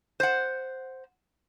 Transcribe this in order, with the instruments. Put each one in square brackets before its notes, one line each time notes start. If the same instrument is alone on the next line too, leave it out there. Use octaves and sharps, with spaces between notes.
[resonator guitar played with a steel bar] C5 F#5